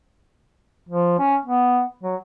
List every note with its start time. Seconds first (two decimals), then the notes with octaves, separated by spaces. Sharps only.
0.89 F3
1.19 C#4
1.46 B3
2.03 F#3